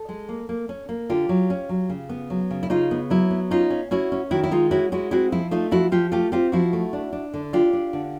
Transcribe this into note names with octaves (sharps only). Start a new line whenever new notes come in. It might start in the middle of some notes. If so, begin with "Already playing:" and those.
Already playing: A4
G#3
A#3
A#3
C#4
A#3
D3 F4 G4
F#3
C#4
F#3
C#3
B3
F#3
C#3
E4
C#3 D#4 F4
B3
F#3 E4
B3
C#4 D#4 F4
C#4
C#4 E4 F#4
C#4
D#3 E4 F#4
E4
G#3 D#4 F4
C#4 E4 F#4
G#3 E4 F#4
C4 E4 F#4
F3 E4
A3 D#4 F4
F3 E4 F#4
F3 F4 G4
A3 F4 G4
C4 F4 G4
F3 E4 F#4
A3
D4
D4
D3
D4 F4 G4
D4
D3